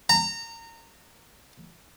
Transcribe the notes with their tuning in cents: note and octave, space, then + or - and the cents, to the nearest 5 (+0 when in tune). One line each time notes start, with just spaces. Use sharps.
A#5 -25